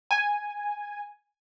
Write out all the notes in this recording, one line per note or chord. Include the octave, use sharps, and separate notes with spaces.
G#5